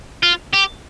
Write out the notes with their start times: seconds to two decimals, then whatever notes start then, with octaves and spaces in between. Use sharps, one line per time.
0.23 F4
0.53 G4